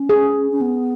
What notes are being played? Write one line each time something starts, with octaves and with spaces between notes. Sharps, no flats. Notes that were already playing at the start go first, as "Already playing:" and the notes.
Already playing: C#4
G#4
C#4
B3